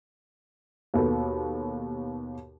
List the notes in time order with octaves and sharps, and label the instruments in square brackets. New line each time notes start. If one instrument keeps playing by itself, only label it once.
[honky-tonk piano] D#2 B2 B3 A4